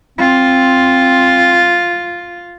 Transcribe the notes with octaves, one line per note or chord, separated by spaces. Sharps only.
C4 F4